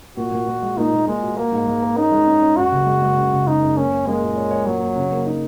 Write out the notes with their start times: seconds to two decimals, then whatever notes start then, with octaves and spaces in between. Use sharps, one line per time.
0.17 A#2 F#4
0.32 A#2
0.47 A#2
0.62 G#3
0.77 A#2 D#4
0.92 A#2
1.07 A#2 G#3
1.22 F#4
1.37 A#3 A#4
1.52 G#2
1.67 G#3
1.83 A#4
1.97 C#4 D#4
2.12 G#3
2.27 C#4
2.42 C#4
2.56 F#2 F#4
2.72 F#1
2.86 G#3
3.02 G#3
3.17 C#3
3.32 C#3
3.47 C#3 D#4
3.62 F#2
3.76 A#3 C#4
3.91 A#3
4.06 G#3 A#3
4.22 A#2
4.36 C#5
4.51 C#5
4.66 A#2 F#3
4.81 A#2
4.96 C#3
5.11 A#3
5.26 D#4